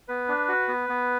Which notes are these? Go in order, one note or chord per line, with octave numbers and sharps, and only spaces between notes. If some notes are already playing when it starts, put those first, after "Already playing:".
B3 B4
D4
F#4
B3
B3